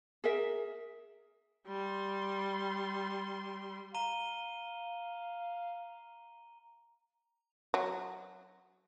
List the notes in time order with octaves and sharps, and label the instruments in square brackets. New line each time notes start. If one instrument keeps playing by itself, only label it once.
[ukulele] G#4 A#4 E5
[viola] G3 C6
[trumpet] F5 [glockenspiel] A#5 D#7 G7
[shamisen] F#3